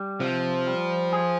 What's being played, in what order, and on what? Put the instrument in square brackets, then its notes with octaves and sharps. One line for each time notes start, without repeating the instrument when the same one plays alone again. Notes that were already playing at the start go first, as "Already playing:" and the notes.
Already playing: [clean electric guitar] G3
[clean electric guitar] C3 [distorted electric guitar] F3
[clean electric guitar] G3
G#4